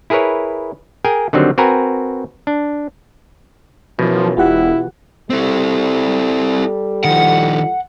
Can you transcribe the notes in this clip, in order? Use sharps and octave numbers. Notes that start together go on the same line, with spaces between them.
E4 G#4 A#4 B4 C#5
G#4 A#4 G5 G#5
D3 D#3 F#3 G3 C4
C4 F#4 A#4 B4 G#5 A#5
D4
F#2 B2 E3 F3
E1 E4 F4 G4 F#5
G3 C4 E4 A4
D#3 F3 F#5